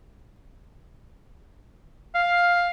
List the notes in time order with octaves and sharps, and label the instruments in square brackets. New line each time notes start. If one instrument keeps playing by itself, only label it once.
[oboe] F5